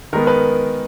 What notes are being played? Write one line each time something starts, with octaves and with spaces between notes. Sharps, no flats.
D#3 G#3 B3 A#4
B4